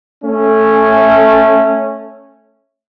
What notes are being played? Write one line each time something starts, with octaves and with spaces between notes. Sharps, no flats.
A3 C#4